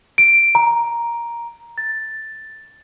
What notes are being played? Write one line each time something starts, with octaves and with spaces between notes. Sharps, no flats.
D7
A#5
A6